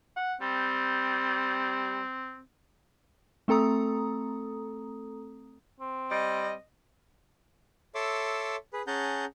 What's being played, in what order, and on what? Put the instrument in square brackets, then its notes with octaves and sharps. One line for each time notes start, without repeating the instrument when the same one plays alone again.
[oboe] F#5
[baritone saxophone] G3 [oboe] C4
[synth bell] A3 C4 A4 A#5 D#6
[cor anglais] C4
[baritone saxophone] G3 [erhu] D#5
[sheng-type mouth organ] A4 C#5 E5 C6 D6 E6
G#4 B4
C#4 G#4 F#5 A5 A#5 G6